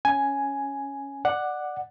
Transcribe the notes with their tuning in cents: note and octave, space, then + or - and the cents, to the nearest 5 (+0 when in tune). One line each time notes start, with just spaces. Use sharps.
C#4 +0 G#5 +5
D5 +15 F#5 +0